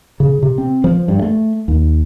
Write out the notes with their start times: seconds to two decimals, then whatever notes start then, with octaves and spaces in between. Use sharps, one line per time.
0.20 C#3
0.43 C3
0.58 C4
0.84 F3
1.08 G2
1.22 A3
1.68 D#2